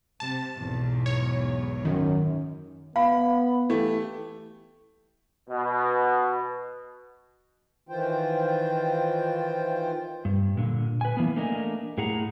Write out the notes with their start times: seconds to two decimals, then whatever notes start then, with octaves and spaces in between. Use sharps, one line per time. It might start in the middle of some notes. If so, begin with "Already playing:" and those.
0.20 C3 A5
0.55 B1 E2 G#2
1.06 C#5
1.85 F#2 D#3
2.96 B3 F5 B5
3.69 E3 A3 G4
5.48 B2
7.88 D#3 E3 F4 C5 G5
10.25 G2
10.57 A#2 D3
11.01 B4 G#5
11.17 E3 A#3 B3
11.36 A3 A#3 D4 A#4 D#5 G#5
11.98 A2 G#4 F#5 A#5